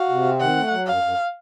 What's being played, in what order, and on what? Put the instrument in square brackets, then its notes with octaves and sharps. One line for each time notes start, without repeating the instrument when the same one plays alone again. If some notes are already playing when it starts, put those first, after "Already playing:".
Already playing: [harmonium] F#4 [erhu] F5
[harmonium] C3
C4
[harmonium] D#3 [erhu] F#5
[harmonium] A3
F#3
[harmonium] F#2 [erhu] F5
[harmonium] F#2